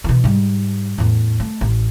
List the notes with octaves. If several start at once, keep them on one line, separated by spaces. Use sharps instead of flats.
B2 E3
G#2 G3
E2 A2
A3
A1